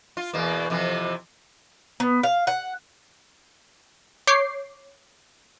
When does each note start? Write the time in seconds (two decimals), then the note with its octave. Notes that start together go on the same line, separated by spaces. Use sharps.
0.17 F4
0.33 E2 B2 A#3
0.70 F2 C3 E3
2.00 B3
2.23 F5
2.47 F#5
4.27 C#5 D6 G6 C7